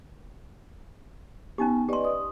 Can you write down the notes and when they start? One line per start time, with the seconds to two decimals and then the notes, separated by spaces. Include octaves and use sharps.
1.58 B3 C#4 D#4 G4 G#5
1.89 G4 B4 D5 D#5 C6
2.05 D#6